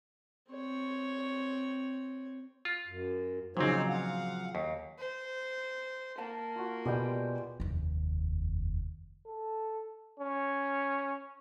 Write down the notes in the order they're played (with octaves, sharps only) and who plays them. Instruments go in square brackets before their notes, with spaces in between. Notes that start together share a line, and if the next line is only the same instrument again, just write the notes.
[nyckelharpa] C4 C#5
[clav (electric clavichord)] F4
[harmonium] F#2
[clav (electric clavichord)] A#2 C4 [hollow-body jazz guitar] C#3 F3 F#3 [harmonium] D#4 C5 C#5
[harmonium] F5 F#5
[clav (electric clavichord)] D#2
[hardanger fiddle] C5
[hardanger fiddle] A#3 [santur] F5 A5
[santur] F4 F#4
[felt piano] B2 [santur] G3 G#3 G5
[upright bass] F1 D#2
[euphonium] A4
C#4